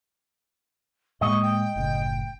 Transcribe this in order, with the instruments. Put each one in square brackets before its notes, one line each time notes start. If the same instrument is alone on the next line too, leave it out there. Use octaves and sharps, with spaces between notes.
[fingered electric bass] A2 G#3 A#3 [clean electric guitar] D#5 [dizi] C#6
[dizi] G5
[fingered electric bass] F#1 A2 C#3